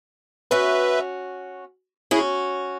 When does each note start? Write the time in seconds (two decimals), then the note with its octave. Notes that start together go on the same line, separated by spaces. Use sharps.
0.51 C#4 F#4 B4 E5
2.11 C#4 E4 F#4 G#4